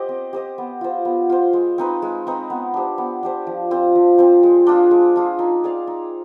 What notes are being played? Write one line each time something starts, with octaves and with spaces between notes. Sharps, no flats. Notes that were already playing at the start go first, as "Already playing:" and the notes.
Already playing: G4 C5 D#5
C4
G4 C5 D#5
B3
F4 C5
B3
F4 C5
G#3
C4 D#4 B4
G#3
C4 D#4 B4
B3
D4 G4 C5
B3
D4 G4 C5
F3
C4 F4 C5
F3
C4 F4 C5
G#3
D4 F4 G#4
G#3
D4 F4 G#4
D#4
G#4 D5 F5
D#4